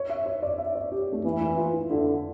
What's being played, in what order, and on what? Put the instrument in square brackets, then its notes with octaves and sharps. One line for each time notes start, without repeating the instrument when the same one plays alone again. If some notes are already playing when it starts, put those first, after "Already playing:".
Already playing: [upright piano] C#5
E5
C#5
D5
E5
D5
G4
A3
[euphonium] E3 [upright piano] A#3
[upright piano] E4
F4
E4
[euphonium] D3 [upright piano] E4